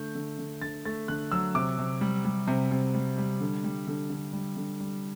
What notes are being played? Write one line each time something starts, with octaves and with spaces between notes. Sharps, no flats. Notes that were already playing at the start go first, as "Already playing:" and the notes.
Already playing: D3 A3 G6
D3
D3
D3 A6
A3 A6
D3 F#6
F#3 E6
C3 D6
C3
G3
G3
C3
C3
G3
G3
D3
G3
D3
D3
G3
D3
G3